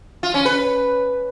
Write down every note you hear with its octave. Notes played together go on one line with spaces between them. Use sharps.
F4
C#4
B4